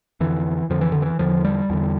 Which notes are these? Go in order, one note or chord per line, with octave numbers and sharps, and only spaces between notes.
F2 D3 E3
F2 D3 F3
E3
D3
E3
E2 D3 F3
G3
E2 D3